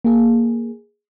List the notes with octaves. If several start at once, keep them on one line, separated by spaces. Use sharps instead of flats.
A#3 G#4